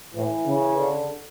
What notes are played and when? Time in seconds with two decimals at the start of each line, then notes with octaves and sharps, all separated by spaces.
0.14 A2 E3
0.46 C#3
0.77 D3